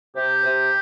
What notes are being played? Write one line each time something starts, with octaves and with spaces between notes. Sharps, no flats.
C3 G4
C3